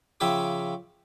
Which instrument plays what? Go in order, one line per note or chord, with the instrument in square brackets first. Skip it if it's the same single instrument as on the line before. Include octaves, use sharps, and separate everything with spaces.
[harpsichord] C#3 F3 E5 G5 B5 D6